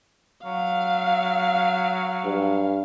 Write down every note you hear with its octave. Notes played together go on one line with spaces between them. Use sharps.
F#3 F5
G2